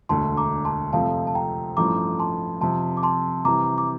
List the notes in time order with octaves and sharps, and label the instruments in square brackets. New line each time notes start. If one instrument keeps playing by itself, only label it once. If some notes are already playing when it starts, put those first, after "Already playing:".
[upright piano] E1 D2 D3 A3 [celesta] A5 C6
[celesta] A#5 D6
A5 C6
[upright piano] F2 C3 F3 A3 [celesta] F5 A5
[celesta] A5
G5 A#5
[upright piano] A1 G2 F3 A3 [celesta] A#5 D6
[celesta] A5 C6
[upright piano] F2 C3 F3 [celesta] A5 C6
[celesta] D6
A5 C6
[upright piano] C3 E3 G3 [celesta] A#5 D6
[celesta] D6